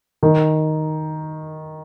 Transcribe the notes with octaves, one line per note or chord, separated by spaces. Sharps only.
D#3